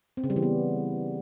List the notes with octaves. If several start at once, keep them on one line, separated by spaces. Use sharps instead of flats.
C4
C#3
G3
E3
B3